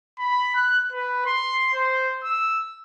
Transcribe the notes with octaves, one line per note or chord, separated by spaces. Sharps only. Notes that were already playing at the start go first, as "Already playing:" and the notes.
B5
F#6
B4
C6
C5
E6